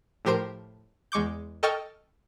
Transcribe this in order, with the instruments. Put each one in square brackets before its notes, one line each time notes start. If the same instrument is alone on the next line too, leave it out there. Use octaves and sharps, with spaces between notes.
[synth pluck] A2 F3 G4 A#4 C5 D7
E2 G#3 C#6 D6 G6
A4 D#5 G5 C#6 F6 A6